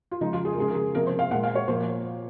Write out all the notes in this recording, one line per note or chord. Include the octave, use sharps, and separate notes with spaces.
F4
C#3 F3 G#3 D#4
F4
G#4
A#4
C#3 F3 G#3 G#4
A#4
G#4
C3 F3 A#3 A#4
C5
F5
A#2 G#3 F#5
F5
C#5
A#2 F3 A#3 C5